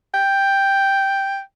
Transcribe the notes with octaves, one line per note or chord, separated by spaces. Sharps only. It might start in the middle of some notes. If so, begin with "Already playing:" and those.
G5